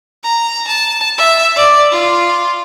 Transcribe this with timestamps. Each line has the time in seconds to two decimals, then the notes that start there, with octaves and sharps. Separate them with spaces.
0.23 A#5
0.67 A5
1.18 E5
1.56 D5
1.91 F4